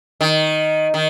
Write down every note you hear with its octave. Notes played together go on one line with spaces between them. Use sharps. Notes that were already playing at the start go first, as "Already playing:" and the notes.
D#3
D#3